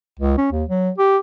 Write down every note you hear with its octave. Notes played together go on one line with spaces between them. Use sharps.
C#2
C#4
D#2
F#3
G4